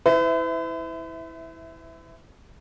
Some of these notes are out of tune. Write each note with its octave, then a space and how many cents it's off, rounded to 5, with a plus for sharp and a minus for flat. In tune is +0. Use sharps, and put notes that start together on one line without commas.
E4 -10 B4 +45 E5 +0